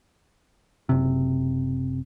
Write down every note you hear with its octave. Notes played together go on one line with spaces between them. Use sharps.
F#1 C3